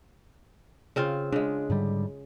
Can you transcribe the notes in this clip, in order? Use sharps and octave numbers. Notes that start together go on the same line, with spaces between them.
C#3 C4 F4
C#3 G#3 D4
G#2 D3 G3